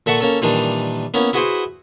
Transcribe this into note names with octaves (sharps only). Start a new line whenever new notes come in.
A#2 A4 E5 F#5 C#6
A#3 C#4 A4
A#2 D#3 E3 G3 D4
A#3 B3 C#4 E4
E4 F#4 G#4 B4 C5 F#5